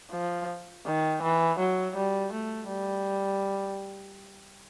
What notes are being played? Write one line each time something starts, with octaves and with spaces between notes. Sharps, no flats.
F3
D#3
E3
F#3
G3
A3
G3